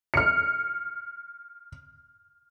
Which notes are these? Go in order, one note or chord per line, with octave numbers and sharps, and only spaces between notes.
F6 C#7